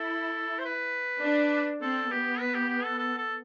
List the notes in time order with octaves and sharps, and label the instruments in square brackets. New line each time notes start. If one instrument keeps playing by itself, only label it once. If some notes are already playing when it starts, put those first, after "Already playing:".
Already playing: [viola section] E4 [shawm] A4
[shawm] C5
B4
[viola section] D4
[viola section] C4 [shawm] A4
[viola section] B3 [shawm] G4
[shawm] B4
G4
G4
A4
A4
A4